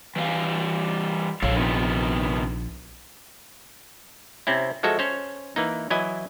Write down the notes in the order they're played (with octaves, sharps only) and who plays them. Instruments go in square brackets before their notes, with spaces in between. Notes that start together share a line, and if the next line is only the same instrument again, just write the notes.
[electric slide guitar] E3 G3 F5
[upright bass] A#1 [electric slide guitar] A4 C#5 F5
[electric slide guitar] C3 D#3 B3
[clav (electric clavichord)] C3 C4 C#4 E4
F3 G#3 F#4 A4 E5
C#4 C5 C#5
E3 A#3 D#4
E3 F#3 E4 D#5 G#5